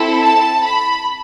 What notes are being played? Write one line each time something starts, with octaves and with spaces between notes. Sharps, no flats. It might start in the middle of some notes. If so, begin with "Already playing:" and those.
Already playing: C4 E4 A4
A5
B5